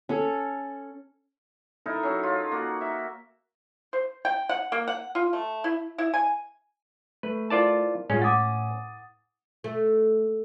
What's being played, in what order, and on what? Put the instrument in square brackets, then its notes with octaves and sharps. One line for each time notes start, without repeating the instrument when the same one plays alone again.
[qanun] C#4 A4
[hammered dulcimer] D#4 E4 A4 A#4
F#3 C#4
F4
A#3 F#4
E5
[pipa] C5
G5
F#5
A#3
F#5
F4
A3
E4
E4
G#5
[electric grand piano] A3 [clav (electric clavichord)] B4
[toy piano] E4 A#4 C5 [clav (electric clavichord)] F4 D5 A5
[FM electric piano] A2 [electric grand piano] G#3 F4 [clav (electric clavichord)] C#4
[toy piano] F#5 G#5 D6 [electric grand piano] D#6 A6
[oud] A3